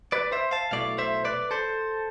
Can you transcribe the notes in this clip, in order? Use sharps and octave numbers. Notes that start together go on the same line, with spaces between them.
B4 D5
C5 E5
F5 A5
B1 B2 A3 E4 D5 F5
C5 E5
B4 D5
A4 C5